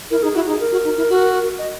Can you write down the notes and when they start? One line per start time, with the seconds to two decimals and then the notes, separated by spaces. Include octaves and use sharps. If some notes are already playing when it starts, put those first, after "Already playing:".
0.11 E4 A#4
0.23 D#4 G#4
0.35 E4 F#4
0.48 D#4 G#4
0.60 A#4
0.72 F#4
0.85 D#4
0.97 E4
1.09 F#4
1.58 D#5